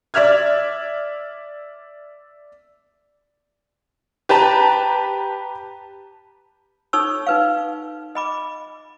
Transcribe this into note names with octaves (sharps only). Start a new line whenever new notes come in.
D5 E5 F6 G#6
G4 B4 A5 A#5
D#4 A4 C#5 C#6 E6
D#4 B4 F5
D#5 B5 D6